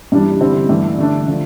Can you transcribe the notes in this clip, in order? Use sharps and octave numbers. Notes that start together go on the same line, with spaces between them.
G2 E3 G3 D4
D3 G3 C4 E4
G2 E3 A3
D3 A3 D4
D3 F3 A3